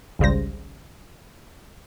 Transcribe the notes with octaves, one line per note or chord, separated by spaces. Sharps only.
G#1 C#2 C#3 G3 C5 A#6